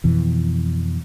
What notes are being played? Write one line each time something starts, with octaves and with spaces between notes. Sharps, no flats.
F2 B2 E3